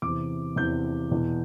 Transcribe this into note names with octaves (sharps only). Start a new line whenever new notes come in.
E2 C3 E3 D6
E2 C3 E3 G6
E2 B2